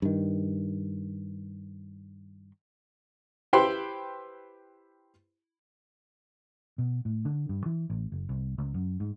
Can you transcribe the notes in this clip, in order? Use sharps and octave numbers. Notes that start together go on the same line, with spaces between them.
G2 D#3
E4 G4 B4 C5 G5 C6
B2
A2
D3
G2
E3
A1
F#1
C2
C#2
F#2
G#2